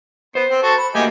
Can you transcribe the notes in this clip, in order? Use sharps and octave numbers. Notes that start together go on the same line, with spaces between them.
B3 C5
C4
F#4 A4
B5
A3 A#3 F#4 G4 D#5 G#5